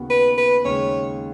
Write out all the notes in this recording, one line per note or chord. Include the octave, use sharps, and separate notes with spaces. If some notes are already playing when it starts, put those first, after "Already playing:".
Already playing: D#2 C#3 B3 F#4
B4
B4
D#2 C#3 G#3 C#5